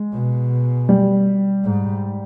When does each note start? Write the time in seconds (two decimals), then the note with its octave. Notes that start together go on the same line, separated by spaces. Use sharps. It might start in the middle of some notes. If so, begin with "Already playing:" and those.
Already playing: G#3
0.13 B2
0.89 G3
1.65 G#2